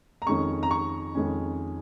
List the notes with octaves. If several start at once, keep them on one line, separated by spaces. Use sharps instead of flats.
A#5
F2 D#3 G#3 C#4 C#6
A#5
C#6
F2 D#3 G#3 C#4